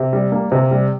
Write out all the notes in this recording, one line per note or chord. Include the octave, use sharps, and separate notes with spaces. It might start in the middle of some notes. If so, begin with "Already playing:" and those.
Already playing: C3
G3
A#3
C3
G3